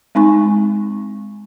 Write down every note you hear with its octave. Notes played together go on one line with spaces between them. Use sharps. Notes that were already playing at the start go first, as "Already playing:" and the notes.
G#3 C4 D#4 G#5 C#6